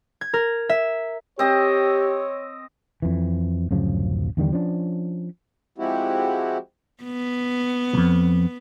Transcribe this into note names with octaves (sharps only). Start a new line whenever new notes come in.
G#6
A#4
E5
C4 G4 C#5 D#5
F2 E3
D1 F#2 C#3 F3
E2 D3 D#3 G3
F3 C#4 D4
F3 G#3 C4 E4 F#4 G4
B3
C2 F2